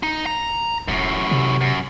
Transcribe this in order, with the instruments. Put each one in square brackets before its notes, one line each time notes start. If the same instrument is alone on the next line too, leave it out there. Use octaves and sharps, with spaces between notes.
[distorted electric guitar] D#4
A#5
[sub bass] E1 [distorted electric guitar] F#2 A2
[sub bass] C3
[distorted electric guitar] F#2